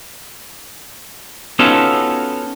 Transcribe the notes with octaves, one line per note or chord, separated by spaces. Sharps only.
B3 C#4 D#4 F4 F#4 A4